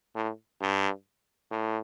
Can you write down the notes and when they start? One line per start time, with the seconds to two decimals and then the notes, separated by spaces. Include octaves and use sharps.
0.15 A2
0.61 G2
1.51 A2